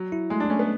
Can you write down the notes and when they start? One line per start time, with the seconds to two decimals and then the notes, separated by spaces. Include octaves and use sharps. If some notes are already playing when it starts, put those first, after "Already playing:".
Already playing: F#3
0.12 E4
0.30 G#3 A3
0.40 D4
0.50 A3 C#4
0.59 B3